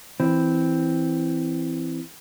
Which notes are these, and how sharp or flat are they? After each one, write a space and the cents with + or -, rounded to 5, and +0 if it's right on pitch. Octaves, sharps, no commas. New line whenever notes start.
E3 +0 C4 +0